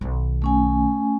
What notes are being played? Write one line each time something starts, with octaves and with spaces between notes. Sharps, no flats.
B1 D#3
A3 C#4 G#5